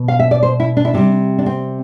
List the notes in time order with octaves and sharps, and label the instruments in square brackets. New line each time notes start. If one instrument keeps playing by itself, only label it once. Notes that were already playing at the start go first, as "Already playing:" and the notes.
Already playing: [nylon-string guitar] B2
F5
E5
D5
C5
E4
D4
E4
C3 G3 D4
D4
C4